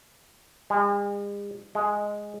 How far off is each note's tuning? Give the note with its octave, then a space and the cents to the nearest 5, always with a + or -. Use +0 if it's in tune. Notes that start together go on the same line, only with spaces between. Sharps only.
G#3 -45
G#3 +0